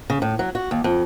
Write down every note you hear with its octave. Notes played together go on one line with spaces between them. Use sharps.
C#3
A2
F#3
F#4
D#2
F2